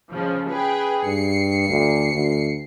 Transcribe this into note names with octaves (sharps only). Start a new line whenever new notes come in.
C#3 F3 G#3
G#4 B4 G5
G2 C7 C#7
D2
D2